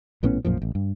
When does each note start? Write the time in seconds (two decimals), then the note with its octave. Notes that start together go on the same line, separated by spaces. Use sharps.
0.23 A#1 A2 B3 C#4
0.45 B1 F#2 A#2 F3
0.62 A1
0.75 G2